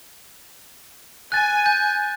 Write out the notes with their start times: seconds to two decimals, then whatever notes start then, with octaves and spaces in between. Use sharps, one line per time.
1.32 G#5 F#6 A6
1.66 G6